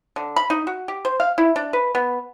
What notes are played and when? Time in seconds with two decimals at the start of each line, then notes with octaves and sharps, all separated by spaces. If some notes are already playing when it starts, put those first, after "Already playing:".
0.16 D3
0.36 B5
0.50 D#4
0.67 F#4
0.88 G4
1.05 C5
1.20 F5
1.38 E4
1.56 D4
1.73 B4
1.95 B3